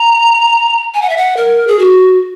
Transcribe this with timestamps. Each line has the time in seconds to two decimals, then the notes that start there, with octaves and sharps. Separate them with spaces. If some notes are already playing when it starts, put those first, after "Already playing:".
Already playing: A#5
0.94 G#5
1.02 F#5
1.10 E5
1.17 F#5
1.37 A#4
1.68 G#4
1.79 F#4